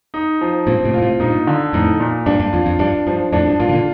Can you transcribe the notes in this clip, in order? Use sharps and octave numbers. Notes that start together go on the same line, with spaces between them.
D#4
F3
G2 A#2 C4
A2 C3
A#2 F4
A2 C3
G2 A#2 D#4
D3
F2 A2 D#4
A#2
G2 D4
G2
F2 F4
F2
G2 D4
G2 F3
F2 A2 D4
G2
G2 A#2 F4
D#3
A#2 D3